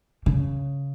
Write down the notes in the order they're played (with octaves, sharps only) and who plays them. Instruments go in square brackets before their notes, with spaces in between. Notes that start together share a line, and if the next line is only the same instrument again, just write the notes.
[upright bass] C#3